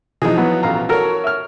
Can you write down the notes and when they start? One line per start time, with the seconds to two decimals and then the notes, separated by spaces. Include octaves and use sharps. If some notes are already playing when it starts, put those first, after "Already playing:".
0.22 B2 E3 F3 D#4 G#4
0.37 F#3 B3
0.63 A1 F5 A#5
0.89 F#4 A4 A#4 C#5 F6
1.24 E5 F6